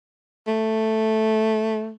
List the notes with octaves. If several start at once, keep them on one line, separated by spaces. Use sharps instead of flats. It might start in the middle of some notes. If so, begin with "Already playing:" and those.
A3